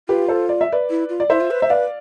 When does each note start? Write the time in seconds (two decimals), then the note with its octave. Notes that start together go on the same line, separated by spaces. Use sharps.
0.08 F4 G4 B4
0.28 A4 C5
0.49 D5
0.61 E5
0.72 B4 D5
0.90 E4
1.09 F4
1.20 D5
1.30 E4 C5 E5
1.40 F4
1.51 B4
1.61 C5 E5
1.70 B4 D5 F5